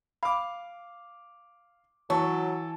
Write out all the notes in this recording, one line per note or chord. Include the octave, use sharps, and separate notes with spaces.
F5 B5 D6
E3 F#3 A4 C#5 C#6